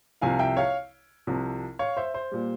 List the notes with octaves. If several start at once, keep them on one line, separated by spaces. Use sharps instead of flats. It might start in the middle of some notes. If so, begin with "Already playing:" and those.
C2 C3 F3 F5 G#5
E5 G5
C#5 F5
C2 C3 F3
C#5 F5
C5 E5
C5
A#2 G3